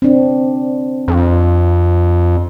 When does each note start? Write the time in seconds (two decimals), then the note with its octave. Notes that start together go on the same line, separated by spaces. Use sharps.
0.02 C4 D4
1.08 F2